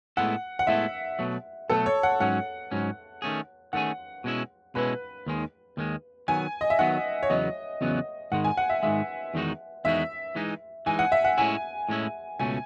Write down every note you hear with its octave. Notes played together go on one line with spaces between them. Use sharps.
A2 G#3 B3 E4 A4 F#5
F#5
A2 G#3 B3 E4 A4 E5
B2 F#3 A3
B2 F#3 A3 A4
C#5
F#5
G#2 F#3 C#4 F#5
G#2 F#3 C#4
D#3 A3 C#4 G#4
D#3 A3 C#4 G#4 F#5
B2 G#3 C#4 E4
B2 G#3 C#4 E4 B4
D#2 D#3 G#3
D#2 D#3 G#3
D#3 F#3 B3 G#5
D#5
E5
D#3 F#3 B3 F#5
C#5
E2 C#3 F#3 B3 D#5
E2 C#3 F#3 B3
G#2 D#3 G#3 F#5
G#5
F#5
E5
G#2 D#3 G#3 E5
E2 D#3 G#3 D#4 F#4
E2 D#3 G#3 D#4 F#4 E5
E3 G#3 D#4
E3 G#3 D#4 G#5
F#5
E5
F#5
A2 G#3 C#4 E4 G#5
A2 G#3 C#4 E4
C#2 B2 A3 C#4 G#5